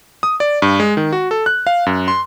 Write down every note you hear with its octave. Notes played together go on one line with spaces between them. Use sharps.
D#6
D5
G2
G#3
D#3
F#4
A4
F#6
F5
F#2
C6